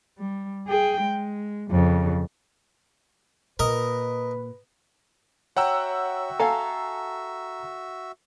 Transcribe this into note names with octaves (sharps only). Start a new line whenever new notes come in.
G3
G#4 G5
G#3
F2 C#3
A#2 A#4 B4 D#5
F#4 C#5 E5 F#5 G5 A#5 E6
A4 F5 G#5 A#5